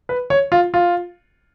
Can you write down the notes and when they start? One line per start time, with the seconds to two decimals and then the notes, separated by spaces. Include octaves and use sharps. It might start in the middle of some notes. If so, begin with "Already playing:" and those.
0.09 B4
0.30 C#5
0.52 F4
0.74 F4